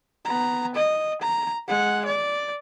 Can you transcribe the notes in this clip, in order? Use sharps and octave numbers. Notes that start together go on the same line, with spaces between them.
B3 A#5
D#5
A#5
G#3 F#5
D5